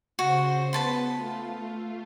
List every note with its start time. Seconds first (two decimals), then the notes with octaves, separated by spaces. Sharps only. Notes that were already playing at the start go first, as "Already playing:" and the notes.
0.19 C#3 F#4 C5
0.73 B3 B4 A5 C6
1.15 A3 F4